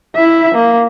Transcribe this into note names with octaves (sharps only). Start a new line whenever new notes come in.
E4 E5
A#3